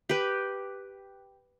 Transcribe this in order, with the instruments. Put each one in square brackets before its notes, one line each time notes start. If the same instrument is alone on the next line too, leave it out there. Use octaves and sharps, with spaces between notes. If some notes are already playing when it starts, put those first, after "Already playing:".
[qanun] G4 B4